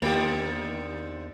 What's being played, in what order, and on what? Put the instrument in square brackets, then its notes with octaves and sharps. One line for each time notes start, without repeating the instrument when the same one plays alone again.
[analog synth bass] E2 [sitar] D3 D#3 F3 [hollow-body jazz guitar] A#3 G4